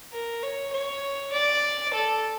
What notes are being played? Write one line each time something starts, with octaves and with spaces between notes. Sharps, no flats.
A#4
C#5
C#5
D5
A4